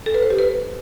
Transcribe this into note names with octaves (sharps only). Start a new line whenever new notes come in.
A4
B4
C5
G4
B4